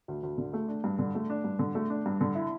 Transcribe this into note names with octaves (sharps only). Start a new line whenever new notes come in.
D2
D2
D3
A3
D4
G2
D3
A3
D4
G2
D3
A3
D4
G2
D3
E4